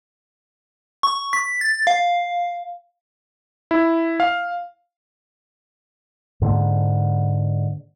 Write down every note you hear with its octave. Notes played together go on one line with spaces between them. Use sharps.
C#6
B6
A6
F5
E4
F5
G#2 D3 A#3